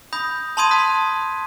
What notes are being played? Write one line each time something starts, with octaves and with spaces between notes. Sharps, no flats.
B5 D#6 G6 A#6
A5 B5 C6 D#6 G#6 D#7
A5 D#6 F#6 B6